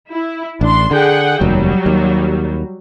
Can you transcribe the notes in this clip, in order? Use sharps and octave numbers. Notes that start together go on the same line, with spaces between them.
E4
A1 D4 C6
D3 G#4 F#5 G5
F1 D#2 F#3 G3
D#2